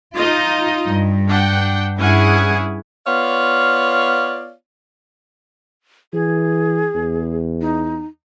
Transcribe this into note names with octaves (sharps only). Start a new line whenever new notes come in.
D#4 F4 D#5
G2
D4 F#5 G5
G2 C#4 E4 G#4 F#5 G#5
B3 F4 C#5 D5 F5
E3 G#4
E2
D#4